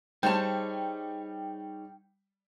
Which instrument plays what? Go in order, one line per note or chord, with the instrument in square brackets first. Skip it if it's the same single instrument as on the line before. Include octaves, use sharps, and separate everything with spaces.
[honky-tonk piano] G3 [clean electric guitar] D#4 G#4 C#5 [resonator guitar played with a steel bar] C5 A5 [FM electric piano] G5